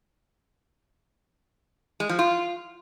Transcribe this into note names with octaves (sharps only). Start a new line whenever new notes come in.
G#3
F3
F4